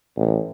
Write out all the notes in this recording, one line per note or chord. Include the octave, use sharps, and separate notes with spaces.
A1